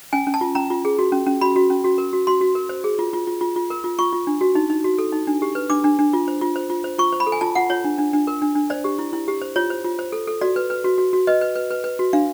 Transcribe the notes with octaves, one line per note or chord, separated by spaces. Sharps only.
C#4 G#5
C#4
A5
F4
C#4 A#5
F4
G#4
F#4
C#4
C#4
F#4 B5
F#4
C#4
F#4
A#4
F#4
F#4 C6
F#4
A#4
C5
G#4
F4
F4
F4
F4
F4
A#4
F4
F4 C#6
F4
D4
F#4
D#4
D#4
F#4
A4
D#4
D4
G4
B4
D4 D6
D4
D4
F4
C5
F4
C5
F4
C5
F4 C#6
C5
B5
A4
G#5
F4 A5
F4 F#5
F4 C#5
D4
D4
D4
A#4
D4
D4
C5 D5
G4
E4
E4
G4
C5
F4 C#5
C5
F4
C5
A4
A4
F#4 D5
B4
B4
F#4
F#4
F#4
B4 D#5
B4
B4
B4
B4
F#4
D4 F5